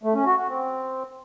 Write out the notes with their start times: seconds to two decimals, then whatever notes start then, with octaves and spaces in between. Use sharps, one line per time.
0.03 A3
0.15 C#4
0.26 F#4
0.37 F#4
0.48 C4